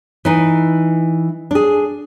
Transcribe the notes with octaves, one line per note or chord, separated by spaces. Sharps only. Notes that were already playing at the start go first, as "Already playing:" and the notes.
E3 D#4 B4
D4 G#4